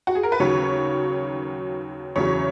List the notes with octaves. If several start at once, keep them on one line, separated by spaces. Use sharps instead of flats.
F#4
G#4
A#4
B4
D#2 C#3 F#3 C#5
E2 C#3 F#3 C#5